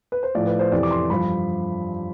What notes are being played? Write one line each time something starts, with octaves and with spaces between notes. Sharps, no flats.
B4
C5
A2 F3 D5
B4
C5
F2 C3 E3 D5
D6
C6
G2 F3 B5